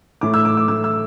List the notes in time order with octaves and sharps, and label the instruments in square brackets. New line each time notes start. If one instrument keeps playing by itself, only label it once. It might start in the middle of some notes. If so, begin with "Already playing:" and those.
[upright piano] A2 A3 D6
E6
D6
D6
A2 A3 E6
E6